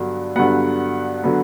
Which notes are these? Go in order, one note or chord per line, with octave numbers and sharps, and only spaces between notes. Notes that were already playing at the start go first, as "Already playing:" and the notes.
Already playing: G2 D3 F#3 B3
G2 D3 F#3 B3 F#5
D3 F#3 B3